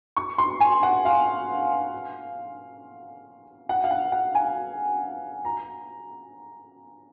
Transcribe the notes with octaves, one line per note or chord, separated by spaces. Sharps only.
C#6
C6
G#5
F#5
F5
F#5
F5
F#5
F#5
G#5
A#5